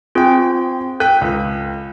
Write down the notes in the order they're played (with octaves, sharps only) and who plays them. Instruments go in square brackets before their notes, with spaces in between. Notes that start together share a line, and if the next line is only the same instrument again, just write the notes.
[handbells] C4 F4 [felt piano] G#4 G5
[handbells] A4 [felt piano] G5 F#6
[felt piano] C#2